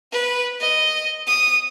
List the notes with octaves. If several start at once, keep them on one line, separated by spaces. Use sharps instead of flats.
B4
D#5
D#6